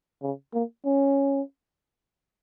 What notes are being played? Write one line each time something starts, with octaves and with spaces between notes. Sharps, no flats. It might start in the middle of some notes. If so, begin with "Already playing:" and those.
C#3
A#3
C#4